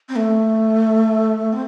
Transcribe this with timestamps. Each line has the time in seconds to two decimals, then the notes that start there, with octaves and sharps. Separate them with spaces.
0.09 C4
0.17 A3
1.53 C4